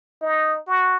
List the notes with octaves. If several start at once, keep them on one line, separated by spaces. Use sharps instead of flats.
D#4
F#4